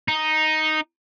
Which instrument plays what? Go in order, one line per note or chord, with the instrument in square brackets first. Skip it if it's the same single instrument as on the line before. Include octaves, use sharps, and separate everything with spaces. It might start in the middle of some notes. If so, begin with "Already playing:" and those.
[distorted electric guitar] D#4